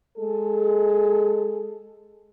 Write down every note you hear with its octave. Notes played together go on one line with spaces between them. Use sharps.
G#3 G#4 A4